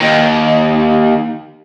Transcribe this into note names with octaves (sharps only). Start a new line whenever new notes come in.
D#2 D#3